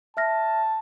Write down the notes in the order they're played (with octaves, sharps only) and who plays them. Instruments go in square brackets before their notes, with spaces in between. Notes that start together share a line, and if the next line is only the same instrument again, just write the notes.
[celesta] E5 F6 A#6 [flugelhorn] A5